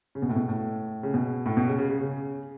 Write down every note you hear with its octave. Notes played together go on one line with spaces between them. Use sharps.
C#3
B2
A2
B2
A2
C#3
B2
A2
B2
C#3
C#3
C#3
C#3